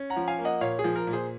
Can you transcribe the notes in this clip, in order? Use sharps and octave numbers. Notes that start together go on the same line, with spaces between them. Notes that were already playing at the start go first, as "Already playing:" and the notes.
Already playing: C#4
F#5 A#5
F3
F5 G#5
A#3
D#5 F#5
A#2 C#5 F5
G#4
F3
A#4
A#2
G#4 C5